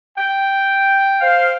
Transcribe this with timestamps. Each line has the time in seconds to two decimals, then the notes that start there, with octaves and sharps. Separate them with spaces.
0.18 G5
1.20 C5 F5